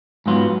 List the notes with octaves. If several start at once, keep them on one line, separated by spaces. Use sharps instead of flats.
G#2 F#3 B3 F4